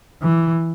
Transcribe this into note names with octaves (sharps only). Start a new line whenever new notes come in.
E3